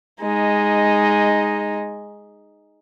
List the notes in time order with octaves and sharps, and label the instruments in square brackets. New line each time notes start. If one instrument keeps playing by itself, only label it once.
[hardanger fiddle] G#3 D#4